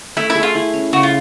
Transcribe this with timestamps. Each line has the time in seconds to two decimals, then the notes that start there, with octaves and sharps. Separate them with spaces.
0.17 A3 E4
0.30 E4
0.35 G#4
0.43 F4
0.55 E4
0.73 C#4
0.93 C#3 F#4
1.03 F4